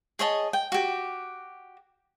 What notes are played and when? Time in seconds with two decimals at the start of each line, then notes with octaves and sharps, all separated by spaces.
0.19 G#4 C#5 D#5 A5
0.53 G5
0.72 F#4 G4